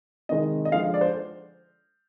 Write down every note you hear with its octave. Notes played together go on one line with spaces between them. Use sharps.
C3 D#3 G#3 D#5
D#5
D3 F3 G#3 F5
D5
C5